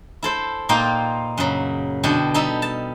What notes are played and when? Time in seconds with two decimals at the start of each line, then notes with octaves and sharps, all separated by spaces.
0.23 E4 A4 C5
0.69 A#2 A#3 D#4 F4 G5
1.38 F#2 C#3
2.03 B2 D3 E4 A4 G5
2.34 G3 D#4 A4 E5
2.62 A5